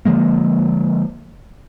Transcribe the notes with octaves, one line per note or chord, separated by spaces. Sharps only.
D3 F3 G#3 A#3